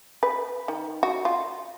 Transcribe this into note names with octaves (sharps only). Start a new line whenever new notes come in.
B4
D#3
F#4
F4